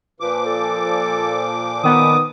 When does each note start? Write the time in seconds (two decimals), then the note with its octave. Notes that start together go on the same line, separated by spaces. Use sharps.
0.20 A#2 F3 B4 D6
0.46 A4
1.83 D#3 B3 D#6